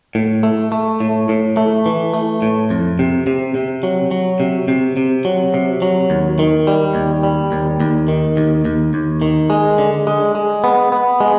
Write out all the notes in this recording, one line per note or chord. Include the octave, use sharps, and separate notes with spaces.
A2
A3
A3
A2
A2
A3
E3
A3
A2
F2
C3
C3
C3
F#3
F#3
C3
C3
C3
F#3
C3
F#3
D#2
D#3
G3
D#2
G3
D#2
D#2
D#3
D#2
D#2
D#2
D#3
G#3
D3
G#3
G#3
B3
B3
G#3